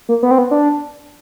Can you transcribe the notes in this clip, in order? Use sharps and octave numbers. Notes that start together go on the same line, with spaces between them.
A#3
B3
C4
B3
D4